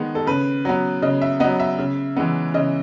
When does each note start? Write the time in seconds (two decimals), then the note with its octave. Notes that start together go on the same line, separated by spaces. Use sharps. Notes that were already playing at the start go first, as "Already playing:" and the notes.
Already playing: D#3 G#3 B3
0.15 A4
0.27 C#3 B4
0.65 F#3 B3
1.02 C#3 D#5
1.21 E5
1.40 F#3 B3 D#5
1.60 E5
1.79 C#3
2.17 E3 G#3 B3
2.54 C#3 D#5